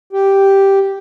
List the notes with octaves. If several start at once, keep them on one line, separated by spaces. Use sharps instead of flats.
G4